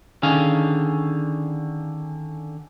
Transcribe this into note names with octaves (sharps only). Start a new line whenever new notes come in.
D3 D#3 C#4 G#4 F5